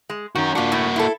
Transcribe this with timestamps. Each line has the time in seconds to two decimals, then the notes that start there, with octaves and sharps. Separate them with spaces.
0.10 G#3
0.35 D#3 C#4 F#4
0.55 A#3 D4 F4 F#4
0.72 A2 A3
0.96 E4 A4